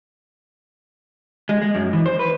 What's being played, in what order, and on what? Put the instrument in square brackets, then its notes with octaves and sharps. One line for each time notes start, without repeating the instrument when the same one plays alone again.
[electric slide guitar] G#3
G#3
F#2
E3
C5
B4